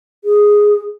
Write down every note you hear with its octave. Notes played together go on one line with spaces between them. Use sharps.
G#4